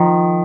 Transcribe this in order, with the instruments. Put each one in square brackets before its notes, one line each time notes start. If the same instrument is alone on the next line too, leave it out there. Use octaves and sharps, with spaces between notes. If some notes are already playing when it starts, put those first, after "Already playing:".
Already playing: [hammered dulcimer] D#3 [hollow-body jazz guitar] F3